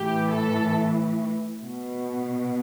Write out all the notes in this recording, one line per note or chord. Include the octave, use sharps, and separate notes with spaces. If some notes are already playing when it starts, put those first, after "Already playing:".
Already playing: A2 E3 G4
A4
B2